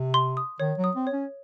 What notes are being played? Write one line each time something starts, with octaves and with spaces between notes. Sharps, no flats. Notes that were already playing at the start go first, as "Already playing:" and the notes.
Already playing: C3
C6
D#6
D#3 C#5
F#3
D#6
C4
C#5
C#4